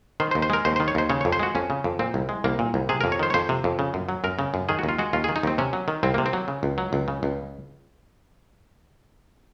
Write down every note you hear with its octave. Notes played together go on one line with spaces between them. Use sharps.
D#3 C5
C5
D#2
C5
G#3 A#4
D#2 C5
D#3 C5
C#5
D#2 C5
C#3 C#5
F2 C#5
C5
G#3 F#4
F2 C#4
C#3
F2
A#2 C4
C2
G#3
C2 A#3
A#2
C2
C3 G#4
F2 A#4
C#5
D#3 C5
C#5
F2 C5
C3
F2
C#3
F#2
F#3
F#2 A#4
C#3
F#2
D#3 G#4
D#2 F#4
F4
G#3 F#4
D#2 F4
D#3 G#4
D#4
D#2 C4
C3 C#4
F#3
D#3
C2 C4
C3 A#3
C4
F#3
C#3
C#2
F#3
C#2
C#3
C#2